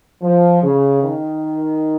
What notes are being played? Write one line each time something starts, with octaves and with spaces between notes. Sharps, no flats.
F3
C#3
D#3